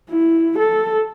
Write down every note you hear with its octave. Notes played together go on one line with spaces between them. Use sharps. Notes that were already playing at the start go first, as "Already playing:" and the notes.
E4
A4